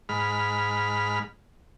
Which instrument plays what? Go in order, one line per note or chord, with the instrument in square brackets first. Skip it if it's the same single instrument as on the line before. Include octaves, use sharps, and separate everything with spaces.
[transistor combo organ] G#2 B5 F6